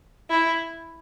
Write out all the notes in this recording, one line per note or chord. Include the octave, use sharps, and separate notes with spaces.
E4